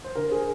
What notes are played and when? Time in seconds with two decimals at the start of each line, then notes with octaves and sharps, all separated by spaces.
0.04 C5
0.15 D3 A#4
0.32 G#4